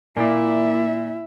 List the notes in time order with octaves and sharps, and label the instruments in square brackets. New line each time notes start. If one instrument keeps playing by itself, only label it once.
[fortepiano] A#2 [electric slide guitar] A#3 D5 [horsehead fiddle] E4 E5